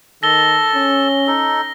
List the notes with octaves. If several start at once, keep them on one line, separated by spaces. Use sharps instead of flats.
D#3 A4 A5 A#6 G7
C#4
D#4 A4